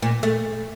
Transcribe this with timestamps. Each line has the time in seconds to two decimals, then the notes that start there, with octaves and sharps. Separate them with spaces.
0.02 A#2
0.23 A3